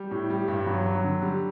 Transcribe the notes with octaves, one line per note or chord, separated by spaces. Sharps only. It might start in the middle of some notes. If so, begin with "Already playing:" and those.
Already playing: G3
A2
G3
G2
F#3
F#3
D3
G3